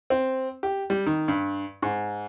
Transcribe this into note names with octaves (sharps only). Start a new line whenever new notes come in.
C4
G4
G3
D#3
G2
G#2